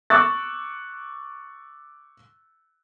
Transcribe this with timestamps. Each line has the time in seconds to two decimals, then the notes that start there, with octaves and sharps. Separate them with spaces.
0.10 C#6 D6 E6 F#6 A6